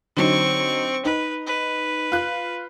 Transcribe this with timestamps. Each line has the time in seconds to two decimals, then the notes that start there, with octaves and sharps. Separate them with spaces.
0.17 D3 F#3 C4 D#4 C#6
1.05 D#4 B4
1.47 B4
2.12 F4 F#6